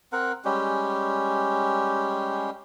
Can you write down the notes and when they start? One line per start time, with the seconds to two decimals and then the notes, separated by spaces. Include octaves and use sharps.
0.13 C4 A#4 F#5
0.45 G3 G#3 C#4 G4